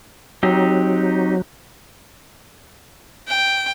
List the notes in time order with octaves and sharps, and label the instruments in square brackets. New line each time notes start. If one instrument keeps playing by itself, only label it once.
[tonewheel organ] F#3 [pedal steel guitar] C4 D#4 G4
[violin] G5